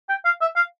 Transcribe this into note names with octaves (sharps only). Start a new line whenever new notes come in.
G5
F5
E5
F5